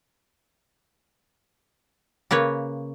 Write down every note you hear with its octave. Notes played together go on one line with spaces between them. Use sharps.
C#3 A#3 B4 C#5